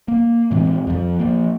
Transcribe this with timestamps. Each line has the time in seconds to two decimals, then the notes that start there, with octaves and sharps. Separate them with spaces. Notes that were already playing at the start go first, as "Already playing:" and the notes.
0.08 A#3
0.51 A2 E3 G#3 C4
0.87 F2 F3
1.19 F3 A#3